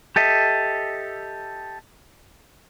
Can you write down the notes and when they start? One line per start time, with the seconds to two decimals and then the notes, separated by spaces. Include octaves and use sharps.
0.16 G4 A4 D#5 E5